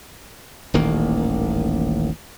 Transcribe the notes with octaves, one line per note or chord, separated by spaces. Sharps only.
D#1 A1 D#3 A#3